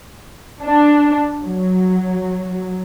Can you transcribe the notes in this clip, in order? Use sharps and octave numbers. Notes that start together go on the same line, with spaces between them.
D4
F#3